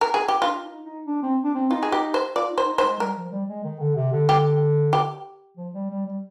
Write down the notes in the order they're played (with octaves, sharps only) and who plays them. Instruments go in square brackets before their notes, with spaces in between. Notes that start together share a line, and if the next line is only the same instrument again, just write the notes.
[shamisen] A#4
G#4
G4
[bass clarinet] D4 [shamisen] F4
[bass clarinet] D#4
D#4
D4
C4
D4
C4
[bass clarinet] D#4 [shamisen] F4
[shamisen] G#4
G4
C5
[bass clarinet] F4 [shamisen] D5
[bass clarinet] D#4
[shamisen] C5
[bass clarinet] D#4
[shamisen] C5
[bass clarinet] G#3
[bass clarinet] G3 [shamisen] A#4
[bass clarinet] F3
G3
G#3
D#3
D3
C3
D3
[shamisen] G4
G4
[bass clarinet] F3
G3
G3
G3